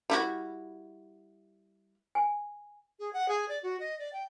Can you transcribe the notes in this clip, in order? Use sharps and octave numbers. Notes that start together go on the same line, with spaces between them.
G3 E4 F#4
G#5
G#4
F#5
G#4
D5
F#4
D#5
D5
G5